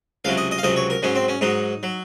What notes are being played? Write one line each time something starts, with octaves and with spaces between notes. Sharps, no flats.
C#2 C3 F#3 F5
D#5
D#5
F5
C#2 C3 F#3 D#5
C#5
A#4
G#2 F#3 C#4
C4
C#4
G#2 F#3 D#4
F#3